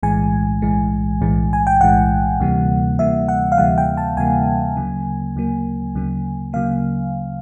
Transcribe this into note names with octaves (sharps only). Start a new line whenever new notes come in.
B1 A2 E3 G#3 G#5
B1 A2 E3 G#3
B1 A2 E3 G#3
G#5
G5
B1 A2 E3 G#3 F#5
D2 C3 E3 G3 A#3
D2 C3 E3 G3 A#3 E5
F#5
F5
D2 C3 E3 G3 A#3 F#5
G5
A5
D2 C3 E3 G3 A#3 G#5
D2 C#3 F#3 A#3
D2 C#3 F#3 A#3
D2 C#3 F#3 A#3
C#3 F#3 A#3 F5